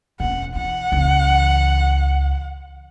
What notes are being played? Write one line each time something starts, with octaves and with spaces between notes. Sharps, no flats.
E1 C#4 F#5
E3 F#5
C#2 E3